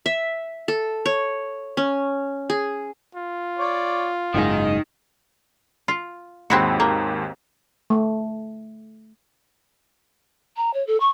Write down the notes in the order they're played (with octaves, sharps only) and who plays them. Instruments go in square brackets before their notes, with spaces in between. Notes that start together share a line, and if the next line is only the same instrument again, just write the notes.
[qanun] E5
A4
C#5
C#4
G#4
[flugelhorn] F4
[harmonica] C#5 D5
[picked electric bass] F#1 G#2 [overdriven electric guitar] D#3 D#4 [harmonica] D#5 D#6
[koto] F4
[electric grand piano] D#2 G#2 [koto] C4 E4 F#4
[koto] A#3
[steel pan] A3
[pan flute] A#5
C#5
A4
C#6